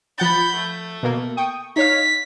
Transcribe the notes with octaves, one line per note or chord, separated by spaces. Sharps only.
F3 F#5 B5 G6 A6
A3
B2 A#3
G5 C#6 D#6
D#4 C#5 F5 B6